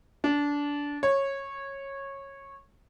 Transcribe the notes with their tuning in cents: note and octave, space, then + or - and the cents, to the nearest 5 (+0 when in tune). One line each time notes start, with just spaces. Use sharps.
D4 -20
C#5 -15